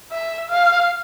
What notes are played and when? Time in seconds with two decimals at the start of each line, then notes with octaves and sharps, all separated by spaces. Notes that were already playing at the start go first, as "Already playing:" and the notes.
0.11 E5
0.50 F5